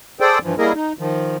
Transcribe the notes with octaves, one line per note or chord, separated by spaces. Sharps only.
G#4 A4 C5 D5 G5
G2 E3 F3
G3 A#3 E4 G#4 A#4 D#5
D#4
D#3 F3